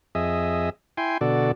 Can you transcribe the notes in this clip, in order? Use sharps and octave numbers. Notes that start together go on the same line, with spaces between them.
F2 G#4 D#5 E5
E4 G5 G#5 C6
B2 D3 F#4 A4 D5